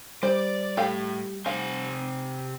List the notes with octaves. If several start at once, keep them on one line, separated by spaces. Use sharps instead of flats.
G3 C5 D5
A2 G4 A4 F5
C3 C5 F5 G#5